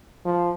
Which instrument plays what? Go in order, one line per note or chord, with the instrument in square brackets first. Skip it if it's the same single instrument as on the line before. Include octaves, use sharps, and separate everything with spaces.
[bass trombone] F3